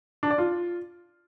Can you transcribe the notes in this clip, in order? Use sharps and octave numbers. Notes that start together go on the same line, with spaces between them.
D4
D5
F4